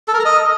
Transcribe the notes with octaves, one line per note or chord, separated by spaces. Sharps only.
A4
A#4
A#5
D#5